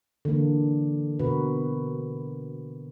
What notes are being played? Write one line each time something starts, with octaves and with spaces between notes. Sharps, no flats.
D3 E3 A#3 D4
B2 D3 F#4 A#4 B4